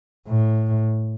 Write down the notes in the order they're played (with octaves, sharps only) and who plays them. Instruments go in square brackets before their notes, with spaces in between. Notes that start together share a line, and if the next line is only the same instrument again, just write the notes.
[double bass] A2